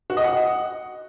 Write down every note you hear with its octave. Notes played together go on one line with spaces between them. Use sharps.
F#4
D#5
F#5